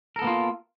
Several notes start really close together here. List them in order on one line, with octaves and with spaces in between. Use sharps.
A#4 A4 B3 A#3 F4